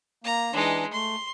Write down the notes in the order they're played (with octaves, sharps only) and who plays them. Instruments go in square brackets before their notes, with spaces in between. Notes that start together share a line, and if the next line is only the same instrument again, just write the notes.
[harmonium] A#3 [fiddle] A#5
[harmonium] E3 D4 [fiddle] G#3 D#4
[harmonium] A3 [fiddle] C6